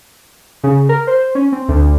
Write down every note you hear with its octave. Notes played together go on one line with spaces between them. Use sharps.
C#3
A#4
C5
C#4
C4
D2